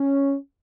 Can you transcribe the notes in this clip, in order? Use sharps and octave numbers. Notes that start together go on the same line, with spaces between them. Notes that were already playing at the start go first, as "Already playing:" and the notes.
Already playing: C#4